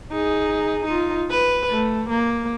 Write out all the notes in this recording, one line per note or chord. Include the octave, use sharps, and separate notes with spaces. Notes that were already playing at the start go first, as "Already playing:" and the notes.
D#4 G#4
D#4 F4
B4
A3
A#3